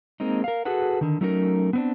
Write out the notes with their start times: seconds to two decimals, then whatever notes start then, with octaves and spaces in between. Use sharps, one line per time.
0.20 G#3 A#3 C4 D#4
0.44 A#4 F5
0.65 F#4 G#4 A4 B4 F#5
1.01 D3 D#3
1.21 F#3 A3 C#4 D#4 G4 A#4
1.73 B3 C4 D4